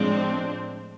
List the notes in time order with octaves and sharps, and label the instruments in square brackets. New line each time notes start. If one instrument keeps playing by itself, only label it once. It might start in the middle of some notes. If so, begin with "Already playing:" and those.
Already playing: [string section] A2 F3 G#3 C4 D4